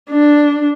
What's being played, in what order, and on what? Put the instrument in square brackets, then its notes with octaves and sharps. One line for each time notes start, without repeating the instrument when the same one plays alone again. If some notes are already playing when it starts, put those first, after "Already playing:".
[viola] D4